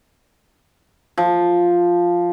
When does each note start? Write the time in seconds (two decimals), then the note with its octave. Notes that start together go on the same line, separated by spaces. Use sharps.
1.17 F3